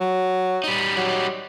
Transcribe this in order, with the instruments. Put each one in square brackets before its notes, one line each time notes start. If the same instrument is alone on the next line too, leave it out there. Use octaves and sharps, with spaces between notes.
[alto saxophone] F#3
[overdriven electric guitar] G3 D#4
[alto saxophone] F#3